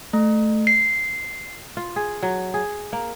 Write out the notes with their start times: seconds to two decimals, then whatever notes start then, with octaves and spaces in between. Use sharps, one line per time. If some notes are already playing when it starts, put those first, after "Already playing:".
0.13 A3
0.67 C7
1.77 F4
1.96 G#4
2.22 F#3
2.54 G#4
2.93 A#3